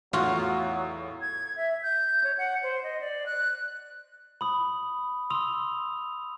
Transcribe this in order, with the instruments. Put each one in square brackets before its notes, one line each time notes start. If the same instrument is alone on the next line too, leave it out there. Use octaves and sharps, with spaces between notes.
[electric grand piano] E2 A2 [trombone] F#3 [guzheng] F4 F#4
[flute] G#6
E5
G6
C#5
F#5
C5
D#5
D5
F#6
[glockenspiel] B5 D#6
C6 D#6 E6 F7